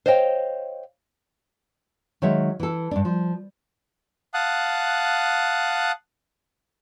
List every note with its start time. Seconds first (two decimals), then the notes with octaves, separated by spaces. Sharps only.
0.06 C5 C#5 D#5 F5 G5
2.22 D#3 F#3 G#3 C#5 E5
2.60 E3 A4
2.91 G2 D4
3.05 F3
4.34 F5 F#5 A5 D#6 F#6